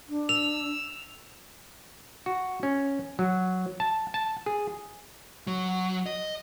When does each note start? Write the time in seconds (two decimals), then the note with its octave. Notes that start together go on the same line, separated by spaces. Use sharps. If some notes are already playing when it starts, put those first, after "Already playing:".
0.09 D4
0.29 E6 F7
2.26 F#4
2.63 C#4
3.19 F#3
3.80 A5
4.14 A5
4.46 G#4
5.47 F#3
6.06 D#5